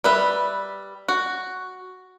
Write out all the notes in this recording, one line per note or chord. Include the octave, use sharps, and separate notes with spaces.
G3 B4 E5
F#4